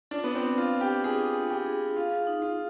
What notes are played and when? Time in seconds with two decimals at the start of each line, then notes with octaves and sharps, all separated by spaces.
0.11 D4 F4
0.24 B3
0.35 C4
0.42 D4
0.58 F4
0.73 D4
0.81 G4
1.03 D4 G#4
1.35 F4
1.50 G4
1.66 G#4
1.96 F4 F5
2.27 D#4
2.42 F4